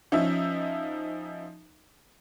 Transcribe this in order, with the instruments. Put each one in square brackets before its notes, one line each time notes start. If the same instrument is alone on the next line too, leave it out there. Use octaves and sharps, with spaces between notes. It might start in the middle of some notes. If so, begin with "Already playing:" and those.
[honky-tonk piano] F3 C#4 D#4 E5